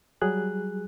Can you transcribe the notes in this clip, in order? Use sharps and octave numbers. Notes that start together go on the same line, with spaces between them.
F#3 G3 G#4 F#6